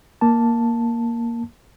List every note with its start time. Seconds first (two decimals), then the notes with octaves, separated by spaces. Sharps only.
0.21 A#3 A5